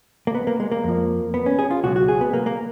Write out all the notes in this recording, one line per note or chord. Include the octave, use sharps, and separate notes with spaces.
A#3
B3
A#3
G#3
A#3
F2 F3
B3
C#4
G#4
F4
C#2 B2 F#3 F#4
F#4
G#4
B3
A#3
A#3